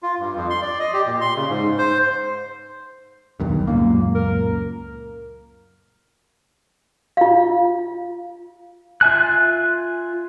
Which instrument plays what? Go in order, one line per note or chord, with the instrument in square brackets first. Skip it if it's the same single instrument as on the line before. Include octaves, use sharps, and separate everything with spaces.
[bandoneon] F4
G2
F2
C6
D5
D#5
G4
A#2
C6
C#3
G#2
C5
[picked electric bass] B1 E2 G2 [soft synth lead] D#3
[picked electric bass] C#2 F#2 A#2 [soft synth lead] A#3
[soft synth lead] A#4
[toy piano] F4 F5
[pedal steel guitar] F4 E5 G#5 F#6